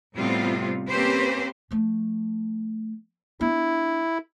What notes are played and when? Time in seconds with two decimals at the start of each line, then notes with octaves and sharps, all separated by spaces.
0.16 A2 C3 G3 B3 C4 F4
0.89 A#3 C4 C#4 G4 B4 C5
1.71 F3 A3
3.41 B3 D4 E4